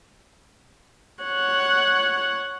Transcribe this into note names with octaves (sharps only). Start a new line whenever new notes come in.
C#5 F#5